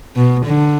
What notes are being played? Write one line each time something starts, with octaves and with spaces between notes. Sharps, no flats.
B2
D3